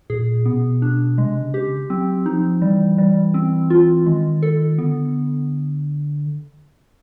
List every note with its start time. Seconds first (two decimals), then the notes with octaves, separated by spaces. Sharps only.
0.10 A#2 G#4
0.45 B2 B3
0.82 D4
1.18 C3 G#3
1.42 C#3
1.54 G4
1.90 F#3 C4
2.26 F3 D#4
2.62 E3 G3
2.98 G3
3.34 C4
3.70 F4
4.06 D#3 G#3
4.43 A4
4.78 D3 B3